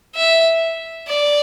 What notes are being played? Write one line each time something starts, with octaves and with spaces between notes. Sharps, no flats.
E5
D5